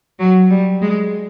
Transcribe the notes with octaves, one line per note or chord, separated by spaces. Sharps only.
F#3
G3
G#3